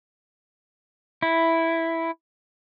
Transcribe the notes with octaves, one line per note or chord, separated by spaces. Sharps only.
E4